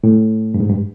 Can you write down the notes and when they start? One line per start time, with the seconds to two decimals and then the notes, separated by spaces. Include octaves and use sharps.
0.04 A2
0.54 G2
0.60 G#2
0.69 G2